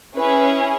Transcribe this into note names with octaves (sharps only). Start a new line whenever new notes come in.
C#4 E4 G#4 B4